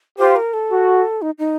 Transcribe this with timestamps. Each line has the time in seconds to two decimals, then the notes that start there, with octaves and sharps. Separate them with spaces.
0.19 F4 G4 C5
0.36 A#4
0.53 A4
0.70 F#4
1.22 D#4
1.39 D#4